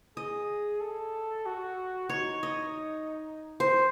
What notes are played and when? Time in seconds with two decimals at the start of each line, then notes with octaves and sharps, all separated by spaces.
0.17 G#4 D#5
0.81 A4
1.46 F#4
2.09 D#4 C#5
2.43 D#5
3.60 C5